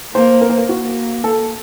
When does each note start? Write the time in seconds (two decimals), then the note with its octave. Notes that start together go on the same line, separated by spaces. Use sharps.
0.15 A#3 C5
0.41 A#4
0.50 C5
0.58 A#4
0.69 A#3 F#4
1.24 A4